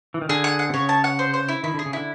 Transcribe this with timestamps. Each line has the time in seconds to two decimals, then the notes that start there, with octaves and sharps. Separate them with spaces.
0.14 E3
0.22 D#3
0.29 D3 G#4
0.44 F#5
0.59 F#5
0.70 C3
0.74 C#3 C#5
0.89 A5
1.04 F#5
1.19 C5
1.34 C5
1.48 E4
1.63 D#3 E4
1.74 D3 G#4
1.85 C#3
1.93 D3 E4